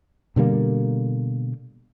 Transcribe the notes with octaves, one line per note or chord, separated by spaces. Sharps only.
B2 D3 G3 A#3